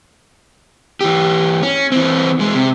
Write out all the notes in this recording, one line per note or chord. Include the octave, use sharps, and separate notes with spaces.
E3 G4
C#4
E3 C4
E2 G#3
C3